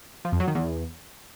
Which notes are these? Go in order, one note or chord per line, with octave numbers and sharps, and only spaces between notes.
F3
F2
F#3
D#3
E2